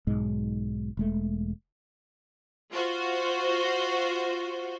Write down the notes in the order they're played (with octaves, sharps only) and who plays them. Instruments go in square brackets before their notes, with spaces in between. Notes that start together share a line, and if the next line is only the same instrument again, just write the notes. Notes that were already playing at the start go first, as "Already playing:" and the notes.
[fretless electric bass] B1 G#2 G#3
E1 G#3 A3
[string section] F4 F#4 C5